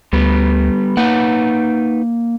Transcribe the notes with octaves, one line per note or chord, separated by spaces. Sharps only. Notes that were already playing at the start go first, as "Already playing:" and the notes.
D2 G3 B3
A#3 D#4 B4 F#5